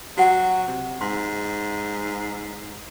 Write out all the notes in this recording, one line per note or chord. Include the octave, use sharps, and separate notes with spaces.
F#3 F#4 F#5
C3
G#2 C6